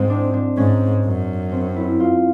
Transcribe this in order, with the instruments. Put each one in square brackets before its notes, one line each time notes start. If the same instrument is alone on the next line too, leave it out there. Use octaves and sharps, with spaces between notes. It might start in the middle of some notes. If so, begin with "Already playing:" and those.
Already playing: [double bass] G#2 [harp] C4
[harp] D4
D4
[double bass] G#2 [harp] C#4
[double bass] F#2
[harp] C4
E4
F4